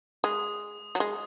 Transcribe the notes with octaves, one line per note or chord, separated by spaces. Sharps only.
G#3 D#6
F#3
G#3